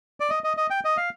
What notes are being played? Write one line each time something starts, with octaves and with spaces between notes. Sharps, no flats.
D5
D#5
D#5
D#5
G5
D#5
F5